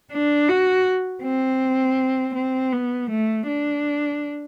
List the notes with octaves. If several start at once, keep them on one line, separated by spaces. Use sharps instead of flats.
D4
F#4
C4
C4
B3
A3
D4